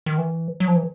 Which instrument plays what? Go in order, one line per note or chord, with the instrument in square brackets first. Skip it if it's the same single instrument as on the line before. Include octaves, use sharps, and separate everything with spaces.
[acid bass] D#3
E3
F#3
F3
E3